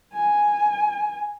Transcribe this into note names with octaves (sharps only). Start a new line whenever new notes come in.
G#5